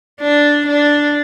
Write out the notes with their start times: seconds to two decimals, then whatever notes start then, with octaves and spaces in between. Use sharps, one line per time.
0.21 D4
0.67 D4